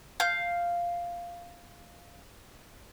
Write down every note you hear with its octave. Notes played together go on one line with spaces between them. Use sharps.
F5 G6